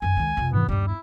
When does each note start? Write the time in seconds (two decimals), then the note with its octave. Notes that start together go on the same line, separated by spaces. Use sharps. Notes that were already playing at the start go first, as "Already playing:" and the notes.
0.02 F#2 D#3 G#5
0.17 C#2 D#3
0.37 F2 C3
0.53 G#2 E3 B3
0.69 D#1 G2 G3 B3 D#4
0.87 E4